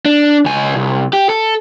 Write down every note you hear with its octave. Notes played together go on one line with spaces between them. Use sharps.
D4
C#2 G#5
C2
G4
A4